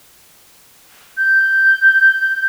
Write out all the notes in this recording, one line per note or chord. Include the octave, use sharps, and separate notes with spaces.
G6